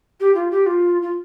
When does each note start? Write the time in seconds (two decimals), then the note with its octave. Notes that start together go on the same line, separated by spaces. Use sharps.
0.20 G4
0.35 F4
0.51 G4
0.66 F4
1.02 F4